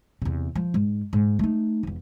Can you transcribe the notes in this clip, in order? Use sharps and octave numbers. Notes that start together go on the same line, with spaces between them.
E2 C3
F3
G#2
G#2
A3 D#4
F1 E2